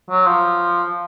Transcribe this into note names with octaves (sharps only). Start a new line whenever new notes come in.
F#3
F3